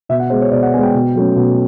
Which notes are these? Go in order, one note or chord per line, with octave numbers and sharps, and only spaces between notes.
B2 E5
F#5
G#3 B3 C5
C#5
B2 D5
F#5
G#3 B3 G#5
G5
B2
F#3 A3 C#4
B2